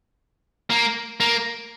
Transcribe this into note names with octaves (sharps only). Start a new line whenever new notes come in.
A#3
A#3